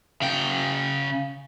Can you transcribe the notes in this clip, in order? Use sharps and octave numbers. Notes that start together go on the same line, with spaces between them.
C#3 G5